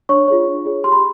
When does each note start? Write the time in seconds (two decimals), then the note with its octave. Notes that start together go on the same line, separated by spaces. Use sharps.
0.09 D4 C#5 C#6
0.28 F4 G#4 C#5
0.46 D4
0.65 F4 G#4 C#5
0.84 G4 C6
0.92 B5